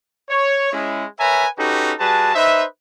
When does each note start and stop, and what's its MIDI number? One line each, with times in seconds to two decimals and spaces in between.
0.30 0.68 73
0.73 1.05 56
0.73 1.05 61
0.73 1.05 64
1.19 1.46 70
1.19 1.46 71
1.19 1.46 73
1.19 1.46 76
1.19 1.46 80
1.19 1.46 82
1.57 1.93 61
1.57 1.93 63
1.57 1.93 66
1.57 1.93 67
1.57 1.93 69
1.57 1.93 71
1.99 2.35 55
1.99 2.35 66
1.99 2.35 68
1.99 2.35 71
1.99 2.35 81
2.35 2.64 63
2.35 2.64 71
2.35 2.64 72
2.35 2.64 75
2.35 2.64 76